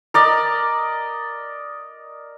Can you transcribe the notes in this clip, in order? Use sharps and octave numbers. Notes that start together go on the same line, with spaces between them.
A#4 D5 D#5